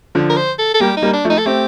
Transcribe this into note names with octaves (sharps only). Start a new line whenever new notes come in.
D3 F3
A#4
C5
A4
A4
G3 A#3 G4
D#4
G3 A#3
D4
F3 A3
D#4
A4
A3 C4 G4